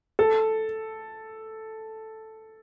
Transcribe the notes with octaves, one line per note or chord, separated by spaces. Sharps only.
A4